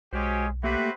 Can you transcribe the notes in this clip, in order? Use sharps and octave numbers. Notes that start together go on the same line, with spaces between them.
B1 G#3 C#4 F#4 G4 C5
A3 A#3 C4 F#4 G4 B4 E5